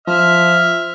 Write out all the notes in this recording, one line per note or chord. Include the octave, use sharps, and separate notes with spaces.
F3 E5 F6